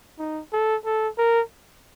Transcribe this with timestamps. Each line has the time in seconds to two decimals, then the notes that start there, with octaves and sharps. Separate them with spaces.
0.19 D#4
0.53 A4
0.86 A4
1.18 A#4